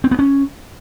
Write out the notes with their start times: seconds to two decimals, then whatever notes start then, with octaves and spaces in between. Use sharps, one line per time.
0.04 C4
0.11 B3
0.19 C#4